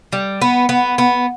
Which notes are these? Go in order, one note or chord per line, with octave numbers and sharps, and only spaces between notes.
G3
B3
B3
B3